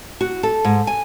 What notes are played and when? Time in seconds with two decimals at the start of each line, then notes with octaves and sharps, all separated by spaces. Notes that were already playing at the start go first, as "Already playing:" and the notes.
0.21 F#4
0.43 A4
0.65 G#2
0.87 G#5